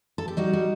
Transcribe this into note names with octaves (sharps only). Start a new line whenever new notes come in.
A4
G4
G3 D#4 F#4
G3